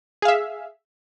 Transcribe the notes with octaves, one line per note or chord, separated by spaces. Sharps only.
G#4 E5 F5